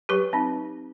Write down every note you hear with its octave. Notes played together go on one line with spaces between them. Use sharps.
F#3 G4 B4
C4 D#4